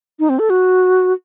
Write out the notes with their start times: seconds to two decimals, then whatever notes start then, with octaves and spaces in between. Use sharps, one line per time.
0.19 D#4
0.29 C4
0.39 A4
0.50 F#4